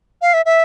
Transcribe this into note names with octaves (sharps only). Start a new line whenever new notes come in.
F5
E5
E5